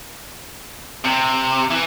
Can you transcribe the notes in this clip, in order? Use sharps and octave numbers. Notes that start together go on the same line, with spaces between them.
C3
E3